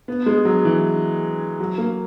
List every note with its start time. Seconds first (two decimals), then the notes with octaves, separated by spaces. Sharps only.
0.08 B3
0.26 G#3
0.45 F#3
0.65 E3
1.60 F#3
1.78 A#3